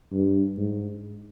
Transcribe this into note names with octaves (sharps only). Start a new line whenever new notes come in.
G2
G#2